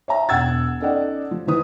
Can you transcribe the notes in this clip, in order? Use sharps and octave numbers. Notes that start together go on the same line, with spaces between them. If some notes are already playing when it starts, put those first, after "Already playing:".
C#5 E5 A#5
E1 F#5 E6 G#6 A6
C#4 D#4 A4 D5 D#5 F#5
F3
E3 E4 B4 D#6